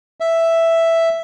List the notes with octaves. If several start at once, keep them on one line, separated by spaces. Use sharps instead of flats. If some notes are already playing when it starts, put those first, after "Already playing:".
E5